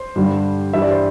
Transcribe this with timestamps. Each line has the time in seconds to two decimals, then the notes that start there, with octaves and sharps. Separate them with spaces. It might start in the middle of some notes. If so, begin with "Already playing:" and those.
Already playing: C5
0.16 G2 D3 G3
0.73 G2 E3 G3 E5
0.82 D5
0.91 C5